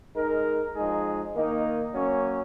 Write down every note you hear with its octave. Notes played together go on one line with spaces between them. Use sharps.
G#3 D#4 A#4
F3 G#3 D#4 G#4
D#3 A#3 D#4
F#3 A#3 C#4